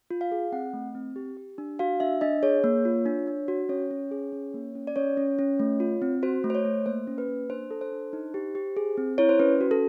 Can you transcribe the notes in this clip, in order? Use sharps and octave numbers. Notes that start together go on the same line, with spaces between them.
F4
F5
G#4
C4 F#5
A3
C4
G4
G4
D4
F#4 F5
D4 E5
D4 D#5
G#4 C#5
A#3
F4
D4
D4
F#4
C#4 C#5
C#4
G#4
C#4
A#3
C#4
D5
C#4 C#5
C#4
C#4
A3
F4
C4
F#4 C5
A3
C5
C#5
A3
A#3 C5
C#4
B4
A#3
D4 C5
A4
C5
D4
D#4
G4
G4
G#4
C4
E4 C#5
C5
C#4 B4
F#4
A4